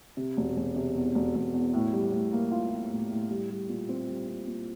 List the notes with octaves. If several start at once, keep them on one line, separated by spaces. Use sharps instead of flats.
C3
E1
E1
C3
E2
E1
E1
E2
A2
G3
A2
A#3
F4
F4
A2
A2
G3
G3
A#2
C4
G3
C4
A#2